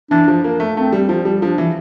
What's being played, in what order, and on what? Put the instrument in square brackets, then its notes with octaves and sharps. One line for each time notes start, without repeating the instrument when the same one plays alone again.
[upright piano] E3 [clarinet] D4
[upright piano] F3
A#3
A3
[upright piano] A3 [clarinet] C4
[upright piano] G3
F3
G3
[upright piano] F3 [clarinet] D4
[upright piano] E3